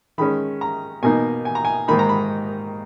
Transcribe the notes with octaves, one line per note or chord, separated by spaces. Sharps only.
D#3 G#3 C#4 B5
A#5
B2 A#3 D#4 G#5
G#5
A#5
G#5
G#2 D#3 A#3 D#4 B5
A#5
B5